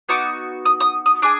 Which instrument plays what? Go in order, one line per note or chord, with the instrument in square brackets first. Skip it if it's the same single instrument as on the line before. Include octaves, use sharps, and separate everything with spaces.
[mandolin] B3 D#4 F#4 D6
D#6
D#6
D#6
D4 G#4 D6